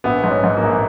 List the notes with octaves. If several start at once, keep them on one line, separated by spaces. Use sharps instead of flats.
A#1 B3
G#2
C#4
G#2
A#3
A#1